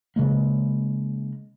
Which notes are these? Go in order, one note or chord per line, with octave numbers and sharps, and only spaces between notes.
C#3 G#3 A#3